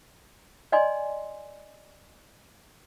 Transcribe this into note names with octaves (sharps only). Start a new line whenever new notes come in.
D5 D#5 G#5 C6